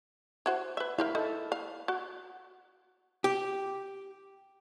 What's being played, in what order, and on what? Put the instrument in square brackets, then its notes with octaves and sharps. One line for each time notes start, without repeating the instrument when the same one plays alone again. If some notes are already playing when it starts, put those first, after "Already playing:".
[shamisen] E4 F#4 C5
B4 E5
[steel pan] E4 [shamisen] A#4 C5 F5
[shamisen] D#4 [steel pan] A4
[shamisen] F5
F#4
[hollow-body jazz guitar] G4